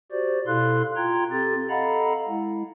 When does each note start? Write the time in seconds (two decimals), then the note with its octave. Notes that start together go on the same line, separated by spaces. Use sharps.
0.12 F#4 G4 C5 D5
0.47 B2 E4 A4 F5 C6 F#6
0.96 F4 G5 A#5 C6 G#6
1.31 C4 G4 A4 A6
1.69 A4 D#5 F5 F#5 A#5 B5
2.29 G#3 E4